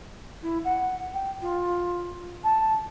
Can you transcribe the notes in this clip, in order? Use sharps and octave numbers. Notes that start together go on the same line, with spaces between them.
E4
F#5
G5
F4
A5